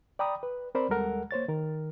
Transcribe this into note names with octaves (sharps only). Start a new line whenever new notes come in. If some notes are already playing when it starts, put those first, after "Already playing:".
D5 G5 A#5 B5 D#6
B4
C4 A#4 C5 D5 B5
D#2 G3 G#3 A4 A#4 F#5
A#3 C5 C#5 A6
D#3 A#4